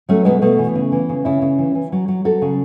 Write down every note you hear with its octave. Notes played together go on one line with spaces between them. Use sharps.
F#3 A3 C#4
B2 G#3 B3
B2 A3
E3
C#3
E3
C#3
C#3 C#4 E4
C#3
E3
E3
F#3
F#3
F#3 F#4 A4
C#3